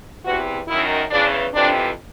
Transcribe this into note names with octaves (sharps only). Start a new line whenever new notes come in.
E2 C3 E3 F#4
F#2 D#3 E4
E2 C#3 E3 D4
F2 C3 E3 D4